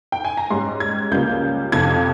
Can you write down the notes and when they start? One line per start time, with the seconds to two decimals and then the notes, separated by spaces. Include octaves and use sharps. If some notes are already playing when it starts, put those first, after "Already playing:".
0.12 G5
0.25 G#5
0.37 A#5
0.51 G#2 G3 C#4 C6
0.80 G#6
1.11 C#2 C#3 G3 A#3 F4 G6
1.72 F2 C3 F3 G#6